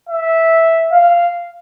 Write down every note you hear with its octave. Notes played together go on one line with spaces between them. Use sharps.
E5
F5